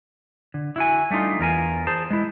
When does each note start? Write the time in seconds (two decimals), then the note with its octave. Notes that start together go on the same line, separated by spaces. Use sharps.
0.54 D3
0.76 E4 F#4 G#5
1.10 G3 A3 D4 D#4 F4
1.39 E2 F4 A#4 G#5
1.87 G#4 C5 A5
2.11 G#3 E4